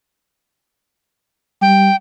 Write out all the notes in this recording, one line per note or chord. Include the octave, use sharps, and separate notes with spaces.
G3 G5